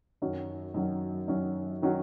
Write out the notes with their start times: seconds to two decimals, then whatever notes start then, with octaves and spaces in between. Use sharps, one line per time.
0.22 F#2 D#3 F#3 C#4 F#4
0.74 F#2 D#3 F#3 C#4 F#4
1.28 F#2 D#3 F#3 C#4 F#4
1.82 D#3 F#3 C#4 F#4